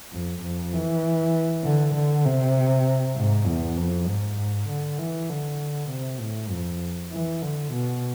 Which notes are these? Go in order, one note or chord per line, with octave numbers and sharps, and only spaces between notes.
F2
F2
E3
D3
D3
C3
G#2
E2
F2
G#2
D3
E3
D3
C3
A2
F2
E3
D3
B2